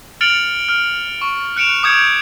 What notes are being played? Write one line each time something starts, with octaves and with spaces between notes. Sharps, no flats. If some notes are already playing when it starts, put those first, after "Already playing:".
F6 A6 C#7 D7 F7 F#7
F6
C#6
F#6 C#7 D7 E7 F7
D6 D#6 G6 G#6 C#7 F7